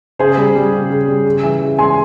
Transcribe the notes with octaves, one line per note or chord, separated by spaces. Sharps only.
C#3 G#4 C5
G3
G3
C#3
C#3
G3
C#3
E3
C#3
G#3 G#5 C6